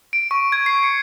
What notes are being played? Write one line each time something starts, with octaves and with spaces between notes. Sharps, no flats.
D7
C#6
G#6
C7
C#7